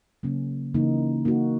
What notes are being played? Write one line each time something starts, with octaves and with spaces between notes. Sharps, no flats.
C#3 F#3 A#3 C#4
C#3 E3 A#3 D#4
A#3 D#4 F#4